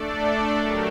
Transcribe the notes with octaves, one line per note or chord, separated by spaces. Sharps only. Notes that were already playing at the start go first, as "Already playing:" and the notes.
Already playing: A3 D4 A4 D5
F#3 A3 D4 G4 A#4